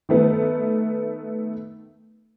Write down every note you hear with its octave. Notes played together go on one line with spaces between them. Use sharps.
D#3 A3 B3 D#4